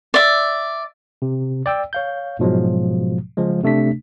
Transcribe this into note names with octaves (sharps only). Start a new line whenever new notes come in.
D5 E5
C3
D5 G5 E6
C#5 F5 G6
G#2 B2 F3 F#3 G#3
C#3 F3 G#3
C3 A3 D4 B6